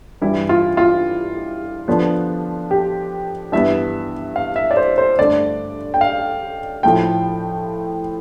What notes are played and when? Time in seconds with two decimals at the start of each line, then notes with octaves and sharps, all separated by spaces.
0.21 G2 E3 G3 E4
0.49 F4
0.77 F4
1.88 D3 F3 B3 D4
2.71 G4
3.52 G2 E3 G3 B3 E5
4.36 F5
4.56 E5
4.71 D5
4.77 C5
4.98 C5
5.19 G2 D3 A3 D4 D5
5.94 G5
6.01 F5
6.83 A2 F3 A3 G5